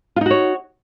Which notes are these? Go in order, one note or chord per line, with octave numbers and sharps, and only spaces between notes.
D#4 F4 F#4 C#5